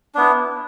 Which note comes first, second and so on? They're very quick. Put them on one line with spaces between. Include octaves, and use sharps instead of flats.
D4 B3 E4